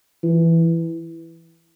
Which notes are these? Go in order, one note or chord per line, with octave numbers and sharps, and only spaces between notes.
E3